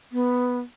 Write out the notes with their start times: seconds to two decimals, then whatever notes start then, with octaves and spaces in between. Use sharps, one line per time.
0.12 B3